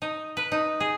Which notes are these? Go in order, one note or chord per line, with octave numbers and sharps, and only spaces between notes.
D#4
B4
D#4
G#4